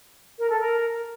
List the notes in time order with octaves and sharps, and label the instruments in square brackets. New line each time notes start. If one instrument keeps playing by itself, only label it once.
[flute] A#4
A4
A#4